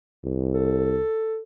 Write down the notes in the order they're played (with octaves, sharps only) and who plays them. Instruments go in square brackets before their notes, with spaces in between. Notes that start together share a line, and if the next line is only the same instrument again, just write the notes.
[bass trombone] C2
[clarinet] A4